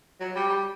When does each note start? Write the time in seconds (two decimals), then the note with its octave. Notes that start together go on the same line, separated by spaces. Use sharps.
0.20 F#3
0.35 G3
0.49 G3